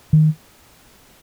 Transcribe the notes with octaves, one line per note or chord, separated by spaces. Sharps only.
D#3